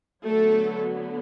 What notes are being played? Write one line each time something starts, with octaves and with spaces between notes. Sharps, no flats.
D3 F#3 A3 B3 A4